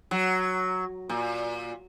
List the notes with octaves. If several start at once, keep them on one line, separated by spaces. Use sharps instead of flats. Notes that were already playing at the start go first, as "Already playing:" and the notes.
F#3
A#2